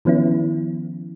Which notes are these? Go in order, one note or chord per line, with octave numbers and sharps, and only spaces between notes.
D#3 F3 B3 C#4 E4